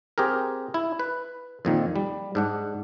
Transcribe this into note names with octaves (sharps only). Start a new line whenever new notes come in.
C4 G4 G#4 A#4
E4
B4
F2 A#2 D#3
G3
G#2 D4 F#5